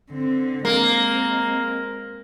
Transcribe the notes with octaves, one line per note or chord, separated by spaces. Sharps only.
D3 C4
G#3 A#3 C4